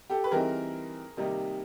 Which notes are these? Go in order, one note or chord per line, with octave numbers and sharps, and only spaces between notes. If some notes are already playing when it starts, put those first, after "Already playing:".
G4 A4
B4
E3 G3 C4 D#4 G#4 A#4
C3 D#3 G3 A#3 D#4